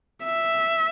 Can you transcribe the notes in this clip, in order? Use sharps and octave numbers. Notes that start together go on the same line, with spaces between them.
E5